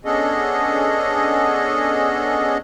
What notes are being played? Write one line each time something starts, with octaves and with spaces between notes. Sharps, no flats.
B3 C#4 D4 G#4 A4 D#5